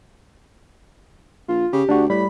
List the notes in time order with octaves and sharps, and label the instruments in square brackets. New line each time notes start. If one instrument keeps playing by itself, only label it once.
[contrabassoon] A#1 [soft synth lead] F4
[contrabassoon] C#3 [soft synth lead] G4
[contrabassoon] D2 [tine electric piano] D4 F#4
[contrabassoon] A2 [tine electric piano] G3 [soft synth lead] B5